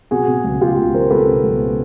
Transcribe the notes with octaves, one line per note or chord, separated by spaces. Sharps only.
B2 F#4 G#4
B2
C#2
C#2 F4 G4
C#2
C#2 A#4 C5
C#2 A4 B4
B2
C#2